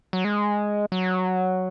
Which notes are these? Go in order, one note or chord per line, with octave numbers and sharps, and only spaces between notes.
F#3
G#3
F#3